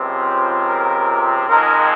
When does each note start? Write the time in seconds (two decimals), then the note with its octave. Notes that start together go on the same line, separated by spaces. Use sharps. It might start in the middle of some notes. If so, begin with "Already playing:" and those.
Already playing: C#2 C3 F3 C4
0.28 C5
0.68 A#4
1.48 F2 D#3 G#3 A#4